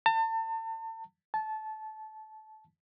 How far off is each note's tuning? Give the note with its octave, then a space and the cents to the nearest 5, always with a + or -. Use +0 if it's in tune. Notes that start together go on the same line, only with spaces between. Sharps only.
A5 +35
A5 -20